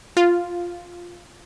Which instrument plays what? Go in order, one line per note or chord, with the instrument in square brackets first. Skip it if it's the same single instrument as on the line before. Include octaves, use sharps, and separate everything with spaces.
[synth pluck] F4